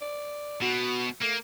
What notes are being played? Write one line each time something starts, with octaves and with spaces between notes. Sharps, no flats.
D5
B2 F#4
A3 A#3